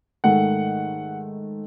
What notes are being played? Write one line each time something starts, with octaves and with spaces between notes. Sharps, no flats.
G#2 D#3 A3 F#5